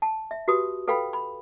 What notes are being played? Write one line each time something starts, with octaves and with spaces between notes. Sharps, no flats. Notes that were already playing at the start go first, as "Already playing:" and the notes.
A5
E5
F#4 G4 B4 D#6
A4 B4 F5 G5 B5
B5